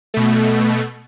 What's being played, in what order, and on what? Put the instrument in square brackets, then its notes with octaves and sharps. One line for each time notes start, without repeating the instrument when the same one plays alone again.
[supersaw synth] B2 A3